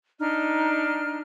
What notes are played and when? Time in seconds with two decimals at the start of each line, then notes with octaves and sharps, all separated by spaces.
0.19 D4 D#4 F6